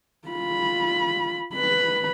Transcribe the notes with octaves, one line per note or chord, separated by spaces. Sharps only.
F4 B5
B4 B5